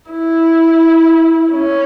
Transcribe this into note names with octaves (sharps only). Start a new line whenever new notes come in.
E4
C#4